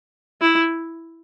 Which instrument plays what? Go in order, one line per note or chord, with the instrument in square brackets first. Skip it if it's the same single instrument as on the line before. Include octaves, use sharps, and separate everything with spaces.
[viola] E4